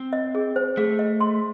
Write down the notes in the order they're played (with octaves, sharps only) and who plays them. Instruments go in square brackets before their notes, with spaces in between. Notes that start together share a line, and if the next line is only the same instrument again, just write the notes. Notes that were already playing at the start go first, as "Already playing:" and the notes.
Already playing: [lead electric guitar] C4
[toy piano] D#5
G#4
C5
[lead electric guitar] A3 [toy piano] G#4
[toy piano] D#5
C6